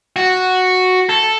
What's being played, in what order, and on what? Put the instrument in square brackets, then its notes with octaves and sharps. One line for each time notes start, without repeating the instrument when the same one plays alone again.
[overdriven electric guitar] F#4
A4